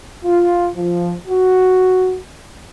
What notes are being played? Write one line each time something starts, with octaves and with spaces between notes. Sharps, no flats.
F4
F3
F#4